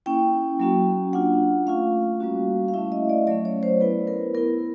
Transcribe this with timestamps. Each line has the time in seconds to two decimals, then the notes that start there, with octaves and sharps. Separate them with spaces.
0.06 A#3 C#4 E4 G5
0.60 F#3 A#3 C#4 F#4
1.13 A#3 D4 F4 F#5
1.66 A3 C#4 F4 F5
2.20 G3 A#3 C#4 F#4
2.68 F5
2.74 A3 C#4 E4 E5
2.92 D#5
3.09 D5
3.27 F#3 A3 C#4 D5
3.45 C#5
3.63 C5
3.81 B3 E4 B4
4.07 A#4
4.34 B3 E4 A#4